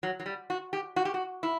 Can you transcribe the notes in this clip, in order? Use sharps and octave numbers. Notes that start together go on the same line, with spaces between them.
F#3
F#3
G3
F#4
G4
F#4
G4
F#4
E4